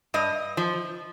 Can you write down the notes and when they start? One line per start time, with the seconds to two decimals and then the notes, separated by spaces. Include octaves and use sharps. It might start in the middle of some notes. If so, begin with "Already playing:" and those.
0.14 G2 D#5
0.57 F3